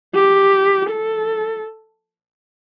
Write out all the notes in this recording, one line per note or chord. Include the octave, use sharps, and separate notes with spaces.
G4
A4